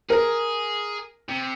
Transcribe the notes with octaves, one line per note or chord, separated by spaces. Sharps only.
G#4 A#4
C3